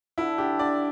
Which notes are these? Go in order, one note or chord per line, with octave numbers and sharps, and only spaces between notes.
D3 E4
D3 G4
D3 D5